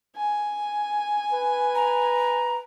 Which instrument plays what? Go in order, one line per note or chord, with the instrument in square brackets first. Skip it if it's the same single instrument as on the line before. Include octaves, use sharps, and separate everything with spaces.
[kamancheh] G#5
[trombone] B4
[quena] A#5